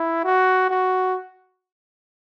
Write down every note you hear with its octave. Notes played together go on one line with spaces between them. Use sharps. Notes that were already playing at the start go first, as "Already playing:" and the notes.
Already playing: E4
F#4
F#4